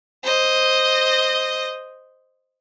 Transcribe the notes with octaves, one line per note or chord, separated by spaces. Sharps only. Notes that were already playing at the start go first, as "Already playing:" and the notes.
C5 D#5